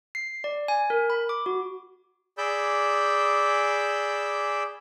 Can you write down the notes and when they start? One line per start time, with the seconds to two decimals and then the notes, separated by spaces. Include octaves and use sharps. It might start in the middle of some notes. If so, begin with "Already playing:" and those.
0.15 C7
0.44 D5
0.68 G#5
0.90 A#4
1.10 B5
1.29 D6
1.46 F#4
2.38 G#4 D5 B5 D6 E6 G6